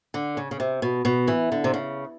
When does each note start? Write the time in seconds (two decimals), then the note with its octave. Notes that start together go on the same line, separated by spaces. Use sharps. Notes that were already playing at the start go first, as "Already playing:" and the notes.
0.14 D3
0.37 C#3
0.51 C#3
0.60 C3
0.82 B2
1.05 B2
1.28 E3
1.52 D3
1.64 C3
1.74 C#3